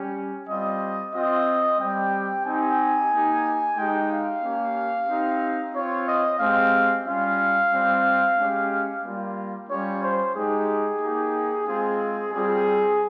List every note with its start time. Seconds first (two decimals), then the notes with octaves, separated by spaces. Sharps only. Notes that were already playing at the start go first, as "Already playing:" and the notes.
Already playing: G3 C#4 G4
0.48 G3 C4 F4 D#5
1.13 C4 F4 D#5
1.79 G3 C4 G4 G5
2.45 C4 D#4 G4 G#5
3.11 A#3 D#4 G4
3.76 G#3 D#4 G4 G5
4.09 F5
4.42 A#3 C#4 G4
5.08 C4 D#4 G4
5.74 C4 F4 C#5
6.07 D#5
6.39 G#3 C4 G4 F5
7.05 G3 C#4 F4 F5
7.71 G3 C4 F4
8.37 G#3 C#4 G4
9.03 G3 A#3 F4
9.69 G3 C#4 F4 C#5
10.01 C5
10.34 G#3 D#4 G4 G#4
11.00 A#3 D#4 G4
11.65 G#3 C4 F4 G#4
12.31 G3 C4 F4 G#4